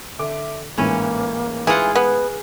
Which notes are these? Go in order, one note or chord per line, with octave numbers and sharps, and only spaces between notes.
D3 E5 D6
A1 G#2 E3 A#3 C#4
E3 F4 G#4 F5 F#5
B3 B4